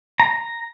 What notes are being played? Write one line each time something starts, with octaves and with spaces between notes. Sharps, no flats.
A#5